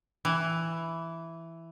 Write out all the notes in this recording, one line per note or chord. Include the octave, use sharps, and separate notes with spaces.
E3